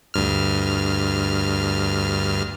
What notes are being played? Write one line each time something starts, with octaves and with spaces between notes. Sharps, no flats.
D2 G2 F6